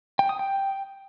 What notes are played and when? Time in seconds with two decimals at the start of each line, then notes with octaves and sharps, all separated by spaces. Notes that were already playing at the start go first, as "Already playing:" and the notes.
0.19 G5
0.29 D#6
0.39 G5